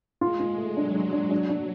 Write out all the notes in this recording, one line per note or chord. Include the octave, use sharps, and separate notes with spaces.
G#3 F4
F4
A3
F#3 D4
D4
D4
F#3 D4
D4